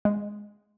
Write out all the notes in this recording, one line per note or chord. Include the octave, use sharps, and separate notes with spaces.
G#3